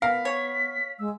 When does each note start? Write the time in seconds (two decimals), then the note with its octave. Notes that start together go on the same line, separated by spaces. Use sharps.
0.02 B3 A#4 F5 B6
0.25 C#5
0.99 G#3 E6